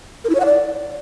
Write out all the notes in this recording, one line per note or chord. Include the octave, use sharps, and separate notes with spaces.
A#4
E4
C#5
F#5
D5